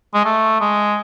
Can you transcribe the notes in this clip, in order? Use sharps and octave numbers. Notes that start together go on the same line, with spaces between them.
G#3
A3
G#3